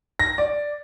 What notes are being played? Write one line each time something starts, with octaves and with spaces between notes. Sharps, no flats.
A#6
D5